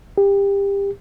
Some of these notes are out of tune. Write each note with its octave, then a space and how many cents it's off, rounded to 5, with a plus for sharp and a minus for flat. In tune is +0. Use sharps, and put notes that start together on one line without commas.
G4 +25